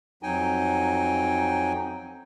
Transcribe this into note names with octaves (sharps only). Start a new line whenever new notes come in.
F2 F#3 D#4 G5 G#5